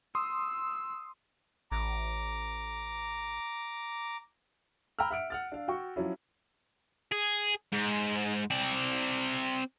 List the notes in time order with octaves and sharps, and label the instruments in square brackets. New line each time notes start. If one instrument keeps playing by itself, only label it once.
[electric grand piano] C6 D#6 [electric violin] E6
[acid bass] A1 [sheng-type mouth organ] A#5 D6
[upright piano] G5 A#5 B5 E6 F6
E5 F#5 F6 D7
F#5 F6 A6
D4 F5
F#4 G5 C#6
F3 F#3 C#4 E4
[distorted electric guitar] G#4
G#2
C4 D5